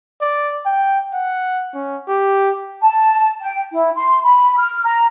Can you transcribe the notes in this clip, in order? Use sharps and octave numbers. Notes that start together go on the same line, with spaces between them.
D5
G5
F#5
C#4
G4
A5
G5
E4
C6
B5
F6
A#5